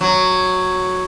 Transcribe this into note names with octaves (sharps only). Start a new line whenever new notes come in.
F#3